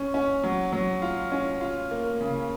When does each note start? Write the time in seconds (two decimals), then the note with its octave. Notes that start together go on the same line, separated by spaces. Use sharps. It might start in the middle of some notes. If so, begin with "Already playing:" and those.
Already playing: C#4
0.14 C#4
0.43 F#3
0.72 F#3
1.02 F4
1.32 C#4
1.61 F4
1.91 A#3
2.21 C#3